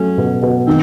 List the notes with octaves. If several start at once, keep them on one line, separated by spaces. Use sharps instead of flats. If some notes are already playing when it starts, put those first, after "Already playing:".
Already playing: F#3 A3 C#4
B2
B2
D#3 C4